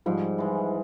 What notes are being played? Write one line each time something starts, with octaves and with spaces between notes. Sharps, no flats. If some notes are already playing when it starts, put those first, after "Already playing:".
G#2 F3 G3
E3 G#3